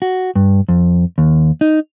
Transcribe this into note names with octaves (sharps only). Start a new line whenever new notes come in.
F#4
G2
F2
D#2
D#4